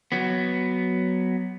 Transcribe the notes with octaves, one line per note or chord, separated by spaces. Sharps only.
F#3 B3